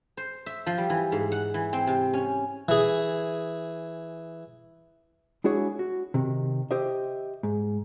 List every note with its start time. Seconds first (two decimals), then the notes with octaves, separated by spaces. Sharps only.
0.17 C5
0.46 E5
0.66 F3
0.78 G3
0.90 E3
1.12 G#2
1.32 F#5
1.54 E3
1.73 C4
1.87 C3
2.14 C#4
2.69 E3 G#4
5.44 G#3 D4 E4 F#4 G#4 C#5
5.79 F#4
6.14 C3 D#3 D#4
6.71 G4 C5 D#5 E5
7.43 G#2